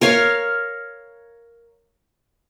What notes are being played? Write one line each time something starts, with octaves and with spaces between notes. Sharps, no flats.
A#4 C#5 F5